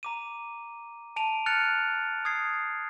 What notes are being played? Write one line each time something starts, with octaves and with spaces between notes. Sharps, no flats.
A#5 D6 D#7
A5 D7 D#7 F7
F6 F#6 A6 C#7 F7
D#6 G#6 C7